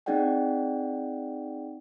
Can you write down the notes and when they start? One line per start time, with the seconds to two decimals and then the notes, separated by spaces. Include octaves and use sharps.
0.06 C4 D#4 G#4 D5 F#5 G5